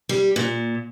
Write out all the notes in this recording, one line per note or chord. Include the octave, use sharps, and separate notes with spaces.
G3
A#2